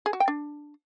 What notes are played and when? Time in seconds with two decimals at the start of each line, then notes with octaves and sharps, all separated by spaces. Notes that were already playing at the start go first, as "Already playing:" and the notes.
0.06 G#4
0.13 F#4
0.20 G5
0.28 D4